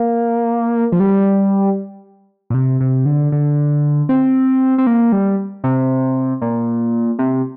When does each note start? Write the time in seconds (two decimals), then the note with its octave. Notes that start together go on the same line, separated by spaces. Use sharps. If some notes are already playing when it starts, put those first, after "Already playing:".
Already playing: A#3
0.92 F3
1.00 G3
2.50 A#2
2.54 C3
2.80 C3
3.06 D3
3.32 D3
4.09 C4
4.78 C4
4.87 A#3
5.12 G3
5.64 C3
6.41 A#2
7.19 C3